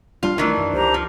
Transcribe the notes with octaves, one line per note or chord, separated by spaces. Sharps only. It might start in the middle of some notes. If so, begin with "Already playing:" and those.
D1 G3 D4 F4
A#1 D#3 E3 G3 A3 D4
F#2
C#2 G4 C5 A#5
F3